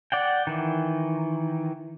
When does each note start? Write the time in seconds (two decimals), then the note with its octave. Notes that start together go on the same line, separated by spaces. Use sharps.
0.12 D5 F#5 G5
0.47 D#3 E3